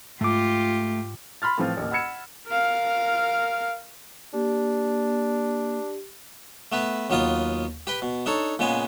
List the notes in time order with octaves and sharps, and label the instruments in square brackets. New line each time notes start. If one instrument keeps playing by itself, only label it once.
[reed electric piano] G#2 D6 [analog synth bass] A3 [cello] F4 G4
[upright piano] B5 C6 F6 A6
A2 E3 F3 C4 F4
A1 D#2
F#5 B5 E6 G#6 C#7 E7
[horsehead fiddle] A#4 F5
[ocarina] A#3 [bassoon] D4 [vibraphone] G4
[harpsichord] A3 B3 B4
D#2 F#3 B3 F4 D#5 D#6
G4 B4 G5
B2
D4 D#4 A4 C#5
A#2 C#3 G#3 B3 G#5